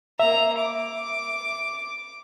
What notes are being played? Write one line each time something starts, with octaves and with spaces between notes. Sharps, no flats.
A#3 E5 A#5
D6